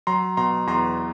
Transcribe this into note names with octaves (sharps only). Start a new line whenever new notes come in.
F#3 A#5 C6
B2 A#5 C6
E2 A#5 C6